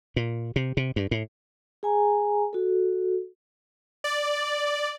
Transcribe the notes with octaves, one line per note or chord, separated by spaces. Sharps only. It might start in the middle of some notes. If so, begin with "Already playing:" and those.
A#2
C3
C3
G2
A2
G#4 G#5 A#5
F#4 A4
D5